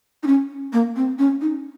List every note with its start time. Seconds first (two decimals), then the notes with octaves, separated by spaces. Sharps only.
0.23 D#4
0.27 C#4
0.73 A#3
0.96 C4
1.19 C#4
1.41 D#4